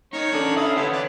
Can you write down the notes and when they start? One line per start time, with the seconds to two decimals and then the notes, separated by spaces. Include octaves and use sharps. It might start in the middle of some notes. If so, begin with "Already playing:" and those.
0.13 D#3 D#4 C#5
0.32 C#4 D4 A4
0.56 E4 F5 D#6
0.76 D3 B3 C#4 E4 G4 C5
0.92 D4